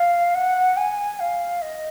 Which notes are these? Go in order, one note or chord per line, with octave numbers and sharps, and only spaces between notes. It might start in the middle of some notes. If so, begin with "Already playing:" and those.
Already playing: F5
F#5
G#5
F5
D#5